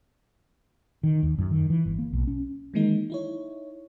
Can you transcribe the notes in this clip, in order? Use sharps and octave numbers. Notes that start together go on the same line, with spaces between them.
D#3
D#2
F#2
D#3
E3
G1
A#3
B1
C#4
D#3 E3 F#3 G#3 A#3 D#4
D#4 E4 C#5